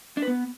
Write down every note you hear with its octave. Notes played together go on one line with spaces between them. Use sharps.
D4
B4
B3